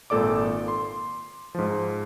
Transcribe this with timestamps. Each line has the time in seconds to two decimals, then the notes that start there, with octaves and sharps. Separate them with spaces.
0.10 G#1 A#2 A4 D5 D6
0.68 C6
1.55 G#2 F3